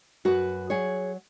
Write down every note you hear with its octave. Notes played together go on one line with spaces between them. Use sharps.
F#2 F#4 B4
F#3 G#4 C#5